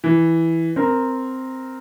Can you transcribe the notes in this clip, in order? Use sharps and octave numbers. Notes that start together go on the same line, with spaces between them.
E3
C4 A#4